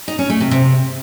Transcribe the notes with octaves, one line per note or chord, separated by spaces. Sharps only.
D#4
C#4
A3
C3
C3